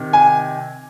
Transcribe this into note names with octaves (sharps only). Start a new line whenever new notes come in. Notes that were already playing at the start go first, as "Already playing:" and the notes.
Already playing: C3 D#3
G#5